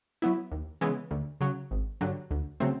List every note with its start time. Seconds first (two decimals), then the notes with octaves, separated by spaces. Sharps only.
0.22 F#3 B3 E4
0.52 D#2
0.81 C#3 E3 G#3 B3
1.11 D2
1.41 C#3 F#3
1.71 G#1
2.01 G2 D3 F#3
2.31 D2
2.60 C#3 F#3 A3 C4